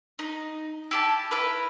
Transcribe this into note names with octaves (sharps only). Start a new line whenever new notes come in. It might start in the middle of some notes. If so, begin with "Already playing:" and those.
D#4
E4 G4 A5
E4 A#4 B4